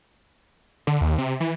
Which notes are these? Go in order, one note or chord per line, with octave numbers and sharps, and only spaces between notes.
D3
D#2
C3
E3